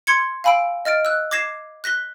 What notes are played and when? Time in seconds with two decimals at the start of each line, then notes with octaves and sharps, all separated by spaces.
0.07 C6 G#6 C#7
0.44 F5 G#5 B5 E6 D7
0.85 D#5 F6 A6 D7
1.05 E6 F#6
1.31 D6 G#6 A#6 C7 E7
1.84 F#6 A#6 B6 G7